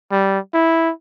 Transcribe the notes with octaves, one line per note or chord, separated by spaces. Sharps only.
G3
E4